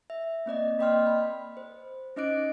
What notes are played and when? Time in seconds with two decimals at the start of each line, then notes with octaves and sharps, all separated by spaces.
0.10 E5
0.46 A#3 C4 D5 D#5
0.79 A#3 D5 D#5 G5 C6 F6
1.06 B5
1.57 C5
2.16 C#4 D#4 D#5 D6 F#6 D7